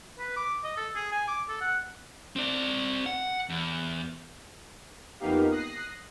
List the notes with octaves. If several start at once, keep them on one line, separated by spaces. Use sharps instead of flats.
B4
D6
D#5
A4
G#4
G#5
D6
A4
F#5
C4 D5
F#5
E2
F2 A#3 B3 D#4 G4 F5
D#6 F#6 A#6 C7